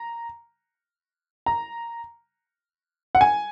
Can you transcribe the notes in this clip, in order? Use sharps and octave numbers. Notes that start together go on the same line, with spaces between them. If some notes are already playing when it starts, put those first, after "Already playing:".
Already playing: A#5
A#5
F#5
G#5